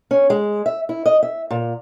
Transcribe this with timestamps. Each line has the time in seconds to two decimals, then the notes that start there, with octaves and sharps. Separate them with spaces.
0.11 C#4
0.30 G#3
0.66 E5
0.89 E4
1.06 D#5
1.23 E5
1.50 A#2